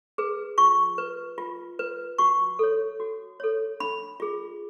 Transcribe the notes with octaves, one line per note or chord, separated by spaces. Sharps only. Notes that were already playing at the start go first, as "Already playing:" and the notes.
G#4 B4
F4 C#6
B4
F4
B4
F#4 C#6
A4 C#5
F#4
A4 C#5
D4 B5
F4 G#4